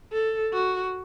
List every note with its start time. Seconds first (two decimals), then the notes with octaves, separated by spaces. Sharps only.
0.12 A4
0.53 F#4